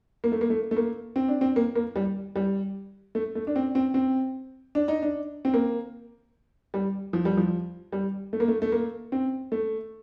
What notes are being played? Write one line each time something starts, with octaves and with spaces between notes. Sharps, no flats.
A#3
A3
A#3
A3
A3
A#3
C4
D4
C4
A#3
A#3
G3
G3
A3
A3
D4
C4
C4
C4
D4
D#4
D4
C4
A#3
G3
F3
G3
F3
G3
A3
A#3
A3
A3
A#3
C4
A3